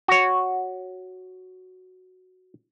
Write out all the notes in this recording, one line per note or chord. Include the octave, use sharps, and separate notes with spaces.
F#4 C#5